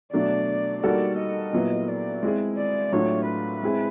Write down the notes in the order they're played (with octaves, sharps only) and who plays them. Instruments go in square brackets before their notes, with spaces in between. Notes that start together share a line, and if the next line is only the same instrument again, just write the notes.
[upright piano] B2 F#3 A3 D4 [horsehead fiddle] D5
[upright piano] G3 A#3 D#4 F#4 A4 [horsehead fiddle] D5
[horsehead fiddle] D#5
[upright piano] A#2 F#3 B3 E4
[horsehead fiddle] D5
[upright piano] G#3 C4 E4 G#4
[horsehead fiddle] D5
[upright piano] A2 F#3 A3 D4 F4 [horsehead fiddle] C#5
[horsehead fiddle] B4
[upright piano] G#3 C4 E4 G#4